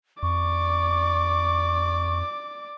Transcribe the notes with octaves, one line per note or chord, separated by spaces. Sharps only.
F2 D5 C#6 D6